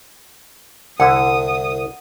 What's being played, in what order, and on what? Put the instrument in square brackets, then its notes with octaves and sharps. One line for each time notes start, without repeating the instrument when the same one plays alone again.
[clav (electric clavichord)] C2 D3 E4 [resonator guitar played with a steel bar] F#5 [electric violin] D#6